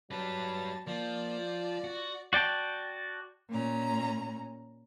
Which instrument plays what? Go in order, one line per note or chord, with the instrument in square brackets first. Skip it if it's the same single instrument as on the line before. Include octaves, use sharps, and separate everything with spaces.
[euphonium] F#3 [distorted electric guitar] G3 B4 [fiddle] A5
[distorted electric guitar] F3 [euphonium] A#3 [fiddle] D5
[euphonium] F4
[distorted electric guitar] F#4
[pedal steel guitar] F#4 D5 G5 A5
[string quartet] A#2 C#4 A#5